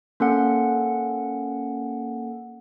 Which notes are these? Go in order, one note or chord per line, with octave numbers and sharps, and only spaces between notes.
A#3 C#4 A4 F#5